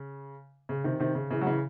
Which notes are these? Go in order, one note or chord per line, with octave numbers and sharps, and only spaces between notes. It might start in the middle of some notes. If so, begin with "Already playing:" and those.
Already playing: C#3
C#3
C3 D#3
C3 D#3
C#3
C#3 E3
F#3
C#3 E3